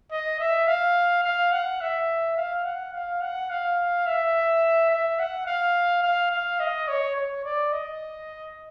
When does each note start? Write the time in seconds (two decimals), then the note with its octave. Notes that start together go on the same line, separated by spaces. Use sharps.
0.12 D#5
0.40 E5
0.67 F5
1.24 F5
1.52 F#5
1.81 E5
2.37 F5
2.65 F#5
2.93 F5
3.21 F#5
3.50 F5
4.07 E5
4.90 E5
5.19 F#5
5.46 F5
6.03 F5
6.31 F5
6.60 D#5
6.88 C#5
7.16 C#5
7.44 D5
7.72 D#5